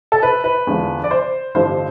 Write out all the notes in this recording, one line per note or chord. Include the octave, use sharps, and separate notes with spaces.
A4
B4
B4
E2 D3 F3
D5
C5
A1 G2 D3 F3 C5